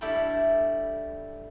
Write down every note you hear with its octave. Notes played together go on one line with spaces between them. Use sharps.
G3 A3 D4 E4 A4